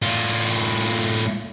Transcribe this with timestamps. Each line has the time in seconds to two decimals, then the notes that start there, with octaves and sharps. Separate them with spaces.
0.02 A2 F4